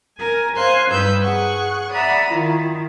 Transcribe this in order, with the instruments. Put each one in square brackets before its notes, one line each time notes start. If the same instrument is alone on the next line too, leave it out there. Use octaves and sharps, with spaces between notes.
[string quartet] A#4 G#5
C5 F5 G#5 C6 F#6
G2 G3 D#4 B4 E6 G6
G#4 F#5 C#6 F#6
D5 E5 F#5 A#5 B5 D#6
D#3 E4 F4